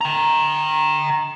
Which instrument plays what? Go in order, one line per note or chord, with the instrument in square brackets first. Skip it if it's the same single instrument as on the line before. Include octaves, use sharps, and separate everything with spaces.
[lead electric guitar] G5 A#5